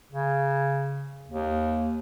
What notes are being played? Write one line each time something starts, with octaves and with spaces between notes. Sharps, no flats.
C#3
D#2